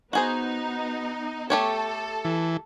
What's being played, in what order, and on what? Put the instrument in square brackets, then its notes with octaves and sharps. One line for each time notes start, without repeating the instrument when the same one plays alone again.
[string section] B3 D#4 [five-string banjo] F#4 G#4 C5
[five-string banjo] A3 G4 C#5 [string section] A4
[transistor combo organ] E3